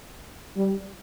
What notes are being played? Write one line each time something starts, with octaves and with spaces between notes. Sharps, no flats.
G3